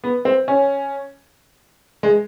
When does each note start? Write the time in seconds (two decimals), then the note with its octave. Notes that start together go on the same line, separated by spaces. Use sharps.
0.04 B3
0.25 C4
0.48 C#4
2.03 G#3